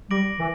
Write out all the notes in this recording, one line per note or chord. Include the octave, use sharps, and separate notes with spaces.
G3 D6 A#6 D7 F#7
E3